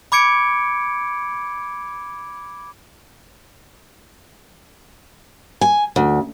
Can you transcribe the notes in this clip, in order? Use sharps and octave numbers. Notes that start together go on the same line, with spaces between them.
B5 D6 G#6 C#7 D7
G#5
D2